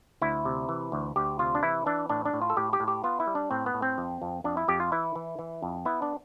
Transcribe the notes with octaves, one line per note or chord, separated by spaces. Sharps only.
D2 E4
C3
E3
D2
D2 G4
C3 F4
D4
E3 E4
E3 D4
A2 D4
D4
A2
F4
A4
A2 G4
G4
A2
G4
B3 F4
E4
G3
D4
A2 C4
B3
A2
C4
F2
F2
F2 D4
E4
F2 G4
F4
E3 E4
E3
E3
F2
B3 E4
D4